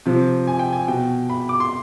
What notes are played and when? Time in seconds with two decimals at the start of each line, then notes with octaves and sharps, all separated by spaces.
0.06 C3 F3
0.48 G#5
0.59 G5
0.73 G#5
0.88 B2 G5
1.30 B5
1.49 D6
1.60 C6